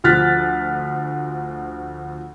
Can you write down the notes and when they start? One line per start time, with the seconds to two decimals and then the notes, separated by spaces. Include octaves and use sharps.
0.04 D2 F3 F6 F#6 A6 B6